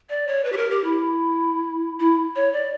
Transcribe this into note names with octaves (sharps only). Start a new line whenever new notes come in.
D5
C#5
B4
G4
A#4
G4
E4
E4
C#5
D5